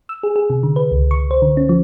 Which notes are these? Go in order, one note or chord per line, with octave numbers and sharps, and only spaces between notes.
E6
G#4
G#4
C3
D3
B4
C#2
C#6
C5
D3
C#4
F3